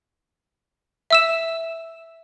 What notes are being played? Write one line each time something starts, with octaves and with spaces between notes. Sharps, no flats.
E5 E6 E7